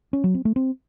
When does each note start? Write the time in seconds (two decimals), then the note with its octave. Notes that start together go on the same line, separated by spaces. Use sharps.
0.13 C#4
0.24 F#3
0.35 C4
0.45 A3
0.56 C4